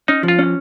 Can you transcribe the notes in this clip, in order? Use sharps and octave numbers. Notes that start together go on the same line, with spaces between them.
C#4 D#4
F3
F4
C#4